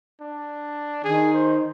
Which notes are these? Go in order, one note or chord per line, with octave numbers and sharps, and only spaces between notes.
D4
D#3 G#4
C5